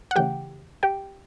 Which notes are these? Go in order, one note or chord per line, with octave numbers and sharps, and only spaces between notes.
F#5
C#3 E3 A3 G4 G5
G4 G5